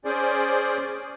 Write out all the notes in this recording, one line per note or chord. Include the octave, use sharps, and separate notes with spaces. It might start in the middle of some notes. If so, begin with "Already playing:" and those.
C#4 G#4 C5 D5